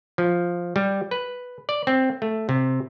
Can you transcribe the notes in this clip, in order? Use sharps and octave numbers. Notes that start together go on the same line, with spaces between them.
F3
G3
B4
D5
C4
A3
C3